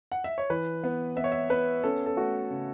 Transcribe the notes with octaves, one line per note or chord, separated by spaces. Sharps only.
F#5
E5
C#5
E3 B4
B3
B3 E5
C#5
E5
B3 B4
C#4 A4
A4
A3 F#4
C#3